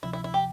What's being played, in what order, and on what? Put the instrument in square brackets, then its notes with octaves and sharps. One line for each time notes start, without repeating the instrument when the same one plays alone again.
[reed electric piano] D2 C3 F3 [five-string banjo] E4
[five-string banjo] E4
E4
G4